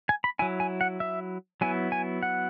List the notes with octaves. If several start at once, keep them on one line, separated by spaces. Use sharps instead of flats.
G#5
B5
F#3 E4 G#5
G#5
F#5
E5
F#3 B3 E4 G#5
G#5
F#5